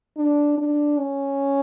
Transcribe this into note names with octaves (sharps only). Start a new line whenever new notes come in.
D4
D4
C#4